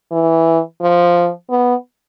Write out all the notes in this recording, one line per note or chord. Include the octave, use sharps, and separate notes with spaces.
E3
F3
B3